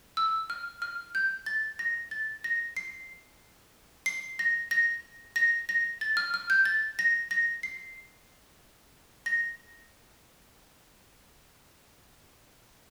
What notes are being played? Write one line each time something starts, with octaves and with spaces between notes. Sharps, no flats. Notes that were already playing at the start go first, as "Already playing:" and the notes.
E6
F6
F6
G6
A6
A#6
A6
A#6
C7
C7
A#6
A#6
A#6
A#6
A6
F6
F6
G6
A6
A#6
A#6
C7
A#6